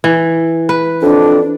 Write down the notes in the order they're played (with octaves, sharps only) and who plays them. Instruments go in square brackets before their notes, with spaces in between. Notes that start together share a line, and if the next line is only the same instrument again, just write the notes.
[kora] E3
B4
[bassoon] F2 [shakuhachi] D4